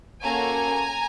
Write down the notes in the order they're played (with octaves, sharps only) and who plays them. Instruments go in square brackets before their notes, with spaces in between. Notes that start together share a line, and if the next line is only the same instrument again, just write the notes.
[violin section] A#3 C#4 F#4 A4 G#5 A#5